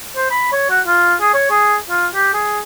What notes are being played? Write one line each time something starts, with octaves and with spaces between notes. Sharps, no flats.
C5
B5
C#5
F#4
F4
G#4
C#5
G#4
F4
G4
G#4